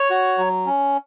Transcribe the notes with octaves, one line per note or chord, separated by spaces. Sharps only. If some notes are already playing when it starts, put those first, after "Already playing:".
Already playing: C#5
F#4
F#3
C#4